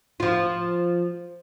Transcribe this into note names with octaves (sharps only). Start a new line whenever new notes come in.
F3 F4